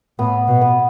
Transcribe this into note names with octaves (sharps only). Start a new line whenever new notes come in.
A2 B3
B2
B3